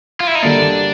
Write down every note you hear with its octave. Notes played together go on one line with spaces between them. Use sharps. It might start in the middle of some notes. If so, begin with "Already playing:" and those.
F4
E4
D#4
D3 G3 A#3 D4